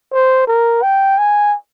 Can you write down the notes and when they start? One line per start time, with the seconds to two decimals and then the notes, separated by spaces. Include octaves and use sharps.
0.13 C5
0.47 A#4
0.83 G5
1.18 G#5